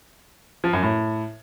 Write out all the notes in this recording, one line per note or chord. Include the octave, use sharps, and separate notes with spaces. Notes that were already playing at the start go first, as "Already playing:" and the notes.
F3
F#2
A2